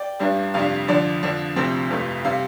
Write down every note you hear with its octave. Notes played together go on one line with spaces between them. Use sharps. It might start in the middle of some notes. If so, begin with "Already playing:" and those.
Already playing: D5 G5
A1 G2 G3 D4
F2 C3 G3 D4 F5
F2 D3 F3 D4 D5
F2 D3 F3 D4
D2 C3 F3 A3 C4
G1 F2 C3 A3
C3 G3 C4 F5